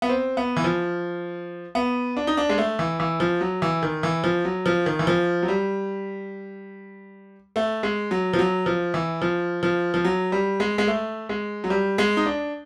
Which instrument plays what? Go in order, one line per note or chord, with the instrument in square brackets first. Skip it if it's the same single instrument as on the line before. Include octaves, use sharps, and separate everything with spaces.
[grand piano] B3
C4
B3
E3
F3
B3
D4
D#4
D4
G#3
A3
E3
E3
F3
F#3
E3
D#3
E3
F3
F#3
F3
D#3
E3
F3
F#3
G3
A3
G#3
F#3
F3
F#3
F3
E3
F3
F3
F3
F#3
G3
G#3
G#3
A3
G#3
F#3
G3
G#3
D#4
D4